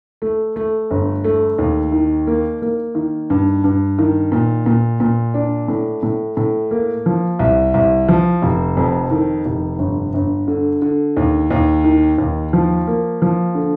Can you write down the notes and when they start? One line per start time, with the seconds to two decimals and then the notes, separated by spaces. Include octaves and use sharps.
0.22 A3
0.56 A3
0.91 G1
1.24 A3
1.59 D#2
1.92 D#3
2.27 A#3
2.62 A#3
2.95 D#3
3.30 G2
3.64 G2
3.99 D#3
4.32 A#2
4.66 A#2
5.00 A#2
5.34 D4
5.68 A2
6.03 A2
6.37 A2
6.71 A#3
7.06 F3
7.39 C2
7.74 C2
8.08 F3
8.42 F1
8.77 F2
9.11 D#3
9.46 F1
9.79 G1
10.14 G1
10.48 D3
10.82 D3
11.17 D#2
11.51 D#2
11.84 D#3
12.18 D#2
12.53 F3
12.87 A#3
13.22 F3
13.55 D3